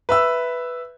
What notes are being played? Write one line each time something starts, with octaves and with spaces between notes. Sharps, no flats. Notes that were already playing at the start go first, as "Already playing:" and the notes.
B4 E5 E6